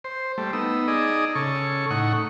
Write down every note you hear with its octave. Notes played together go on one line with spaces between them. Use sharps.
C5
G3 A3
B3 D#4 E6
D#4 G#4 D5 D#5
C#3 A4 C#6
A2 D#4 F#5 C#6